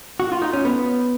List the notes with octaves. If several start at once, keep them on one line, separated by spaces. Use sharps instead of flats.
F#4
F4
D#4
C#4
B3